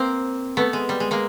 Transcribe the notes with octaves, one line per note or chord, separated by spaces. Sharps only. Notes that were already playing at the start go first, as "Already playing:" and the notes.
Already playing: A#3 C4
A3 B3
G#3
G3
G#3
G#3 A#3